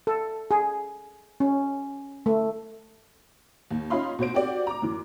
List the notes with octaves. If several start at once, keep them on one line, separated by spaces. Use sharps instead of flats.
A4
G#4
C#4
A3
D#2
C#4 D#4 F4 F5 B5 C6
B2 F#4 C5 D7
C4 F#4 G4 D5
A#5 D6
F#2 E3